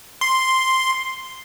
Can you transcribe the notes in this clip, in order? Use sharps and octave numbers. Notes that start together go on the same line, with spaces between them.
C6